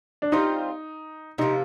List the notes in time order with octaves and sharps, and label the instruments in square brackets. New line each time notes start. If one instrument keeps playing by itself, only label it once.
[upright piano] D4
[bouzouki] G3 C4 F4 C5 [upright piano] D#4
[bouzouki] C3 F3 A#3 [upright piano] D#4